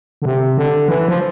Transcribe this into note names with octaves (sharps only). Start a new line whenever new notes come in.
D3
C3
D3
E3
F3